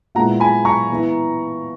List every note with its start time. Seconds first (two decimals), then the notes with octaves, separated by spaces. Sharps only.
0.15 A#2 G#3 B3 E4 F#5 A#5
0.40 G#5 B5
0.65 A#5 C#6
0.90 E3 B3 E4